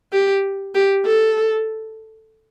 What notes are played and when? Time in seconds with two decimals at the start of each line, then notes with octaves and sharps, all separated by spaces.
0.12 G4
0.75 G4
1.06 A4